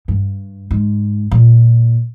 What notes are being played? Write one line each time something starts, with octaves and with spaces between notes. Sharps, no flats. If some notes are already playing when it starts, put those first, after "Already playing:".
G2
G#2
A#2